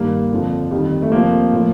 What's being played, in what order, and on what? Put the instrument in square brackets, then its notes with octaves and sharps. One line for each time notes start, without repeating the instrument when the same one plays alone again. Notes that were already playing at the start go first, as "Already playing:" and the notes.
Already playing: [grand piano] G2 D#3 G3 A#3
F2 D3 F3
F2 D#3 G3
A3
F2 C3 F3 A#3
A2 F3